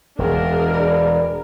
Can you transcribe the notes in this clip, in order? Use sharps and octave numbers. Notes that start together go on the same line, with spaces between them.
E1 D4 G#4 A#4
D5 A#5 B5